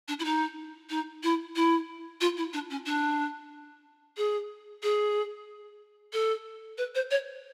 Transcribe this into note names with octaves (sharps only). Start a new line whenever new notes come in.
D4
E4
D#4
D#4
E4
E4
F4
E4
D4
C#4
D4
G#4
G#4
A4
B4
C5
C#5